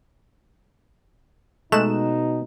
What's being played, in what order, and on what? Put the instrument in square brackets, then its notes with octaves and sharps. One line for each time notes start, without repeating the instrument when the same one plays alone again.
[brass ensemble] B2 D#4 [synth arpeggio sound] G#3 F#6 E7 [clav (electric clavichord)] A3